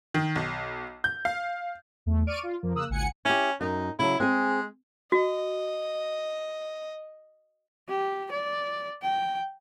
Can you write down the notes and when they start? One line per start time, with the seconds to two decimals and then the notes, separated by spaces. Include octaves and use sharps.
0.14 D#3
0.36 B1
1.04 G6
1.25 F5
2.06 E2 A3
2.27 D5 C#6 F6 D7 D#7
2.43 F4
2.63 F2 F3 A#3
2.74 C#3 A#3 D#6 E6 F#6
2.89 G#1 C#2 F#5 G#5 C#7
3.25 C#4 E4 G4
3.61 F#2 D#4
3.99 C#3 F#3 E4
4.20 G#3 C4 G#4
5.12 F#4 D#5
7.88 G4
8.32 D5
9.02 G5